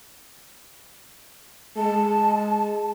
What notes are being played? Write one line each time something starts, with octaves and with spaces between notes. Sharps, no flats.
G#3 A5